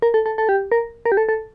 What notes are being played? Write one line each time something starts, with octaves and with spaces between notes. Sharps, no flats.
A#4
A4
A4
A4
G4
A#4
A#4
G4
A4
A4